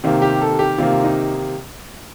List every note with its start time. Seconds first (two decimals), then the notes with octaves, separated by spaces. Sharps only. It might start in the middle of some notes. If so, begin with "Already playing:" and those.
0.04 C3 D#3 A#3
0.22 G4
0.41 A4
0.59 G4
0.78 C3 D#3 A#3 F4
1.04 D#4